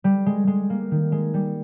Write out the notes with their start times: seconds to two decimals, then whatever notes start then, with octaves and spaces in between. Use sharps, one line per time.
0.04 G3
0.26 G#3
0.47 G#3
0.70 A#3
0.91 D#3
1.12 G#3
1.34 G3